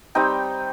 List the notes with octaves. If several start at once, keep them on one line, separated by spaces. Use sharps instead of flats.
G3 C4 D#4 G5